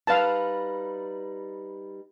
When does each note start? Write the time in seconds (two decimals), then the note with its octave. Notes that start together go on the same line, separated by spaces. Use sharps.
0.07 G3 D#4 B4 F5 A5